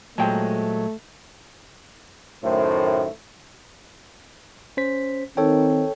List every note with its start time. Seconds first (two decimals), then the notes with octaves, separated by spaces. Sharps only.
0.18 A#2 F#3 G#3 A3 C5 G5 A5
2.44 F#2 A2 D#3 A3 C5
4.77 C#4 C5 B6
5.37 D#3 C4 A4 C#5 G5